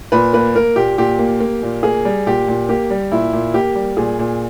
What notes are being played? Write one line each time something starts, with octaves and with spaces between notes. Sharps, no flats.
A#2 B4
A#3 B4
A#3 A#4
A#2 G4
A#2 G4
A#3
A#3
A#2
A#3 G#4
G3
A#2 G4
A#2
A#3 G4
G3
A#2 E4
A#2
A#3 G4
G3
A#2 G#4
A#2